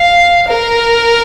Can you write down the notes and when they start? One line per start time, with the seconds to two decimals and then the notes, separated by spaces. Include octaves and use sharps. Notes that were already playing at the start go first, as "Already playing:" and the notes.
Already playing: F5
0.48 A#4